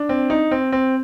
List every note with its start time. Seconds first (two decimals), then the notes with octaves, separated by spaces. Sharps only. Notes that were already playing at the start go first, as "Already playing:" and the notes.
Already playing: D4
0.09 C4
0.30 D#4
0.51 C4
0.72 C4